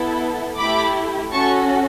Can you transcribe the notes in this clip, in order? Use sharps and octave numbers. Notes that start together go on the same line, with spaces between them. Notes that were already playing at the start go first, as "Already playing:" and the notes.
Already playing: B3 E4 A4
A3 E4 G4 B5 D6
C#4 F#4 A4 A5 C#6